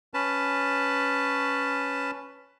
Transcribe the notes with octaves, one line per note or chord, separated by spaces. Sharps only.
C#4 B4 A5